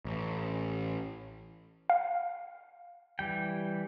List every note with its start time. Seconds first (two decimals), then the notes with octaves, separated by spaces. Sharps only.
0.05 A1
1.90 F5
3.19 E3 G3 G5